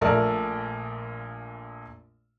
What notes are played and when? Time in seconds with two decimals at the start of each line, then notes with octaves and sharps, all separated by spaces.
0.01 A#1 A#2 A3 A#4 D5